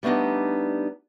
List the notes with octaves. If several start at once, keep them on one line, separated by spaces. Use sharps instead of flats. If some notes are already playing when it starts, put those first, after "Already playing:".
G3 A3 B3 D4 D#4